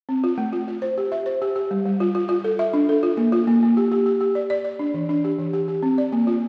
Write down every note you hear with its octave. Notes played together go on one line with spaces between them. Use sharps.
C4
F4
A3
F4
F4
C5
G4
E5
C5
G4
G4
G3
G3
F4
F4
F4
A4
E5
D4
A4
F4
A#3
F4
A#3
A#3
G4
G4
G4
G4
D5
D5
D5
D4
E3
D4
G4
E3
G4
G4
C4
D5
A#3
F4